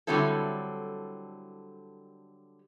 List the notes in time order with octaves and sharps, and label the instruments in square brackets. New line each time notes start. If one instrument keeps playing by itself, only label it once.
[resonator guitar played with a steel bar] D3 F#3 G3 C4 E4 A4